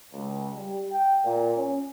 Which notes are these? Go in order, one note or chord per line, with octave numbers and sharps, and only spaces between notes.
C#2
G3
G5
A#2
C#4